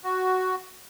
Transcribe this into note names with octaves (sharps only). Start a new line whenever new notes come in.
F#4